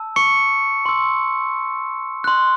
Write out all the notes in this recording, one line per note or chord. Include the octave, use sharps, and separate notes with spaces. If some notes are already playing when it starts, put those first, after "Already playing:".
Already playing: A5 E6
C#6 C#7
C6 E6
C6 F#6